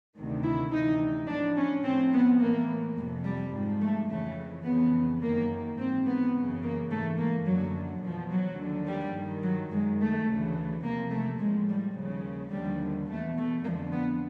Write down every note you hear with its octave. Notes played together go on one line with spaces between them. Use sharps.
D2 C3 D#3
E4
D2 C3 E3 D#4
A2 F3 D4
C#4
A2 F3 C4
B3
A2 E3 A#3
F2 C3 E3 G3
G3
G#2 F3
A3
F2 C#3 E3 A3
F2 C#3 E3 B3
F#2 D#3 A#3
G#2 E3 C4
B3
F#2 C#3 E3
A#3
G#2 E3 A3
A#3
F#2 D3 F3 F#3
E2 B2 F3
F#3
D#2 D3 F3
G3
G2 D#3
F#3
F#2 D#3 G#3
A3
D2 C#3 E3
E2 C3 F3 A#3
A3
A2 F3 G#3
G3
D#2 C#3 F3
D#2 D3 F3 G3
E2 B2 A3
A3
F2 D3 F3 A#3
B3